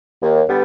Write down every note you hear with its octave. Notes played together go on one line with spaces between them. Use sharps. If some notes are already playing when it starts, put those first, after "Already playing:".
D#2
D3 G3 B3